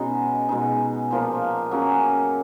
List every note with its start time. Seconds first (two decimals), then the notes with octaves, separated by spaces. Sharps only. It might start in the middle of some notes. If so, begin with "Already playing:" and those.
Already playing: B2 G#3 C#4 D#4 F#4
0.49 B2 G#3 D#4
1.11 A#2 F3 A#3
1.71 F#3 A#3 C#4 G#4